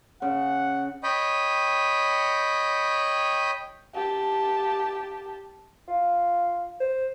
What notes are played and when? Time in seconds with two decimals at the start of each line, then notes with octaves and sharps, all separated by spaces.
0.22 C#3 F#5
1.03 C#5 D#5 G5 B5
3.95 G4 A5
5.88 F4
6.80 C5